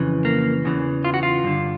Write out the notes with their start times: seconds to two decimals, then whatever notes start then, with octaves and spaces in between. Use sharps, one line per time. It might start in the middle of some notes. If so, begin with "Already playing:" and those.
Already playing: F2 C#3 E3
0.25 A#3
0.65 E2 C#3 E3
1.05 F4
1.14 F#4
1.23 F4
1.44 G2 D3